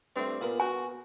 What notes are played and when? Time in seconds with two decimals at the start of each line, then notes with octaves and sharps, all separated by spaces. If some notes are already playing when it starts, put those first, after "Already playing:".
0.16 G2 A3 C4
0.41 A#2 B3 A#4 B5
0.60 F#4 G#5